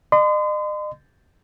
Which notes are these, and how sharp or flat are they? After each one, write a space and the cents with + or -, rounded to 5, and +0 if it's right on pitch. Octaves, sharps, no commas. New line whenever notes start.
D#5 -40 C6 -40